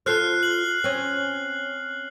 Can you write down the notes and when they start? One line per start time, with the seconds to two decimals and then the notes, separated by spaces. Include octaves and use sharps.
0.06 F4 A4 C5 F6 F#6 C7
0.43 F#7
0.84 C4 C#4